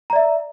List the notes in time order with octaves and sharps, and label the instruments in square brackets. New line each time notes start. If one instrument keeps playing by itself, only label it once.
[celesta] A#5
D5
E5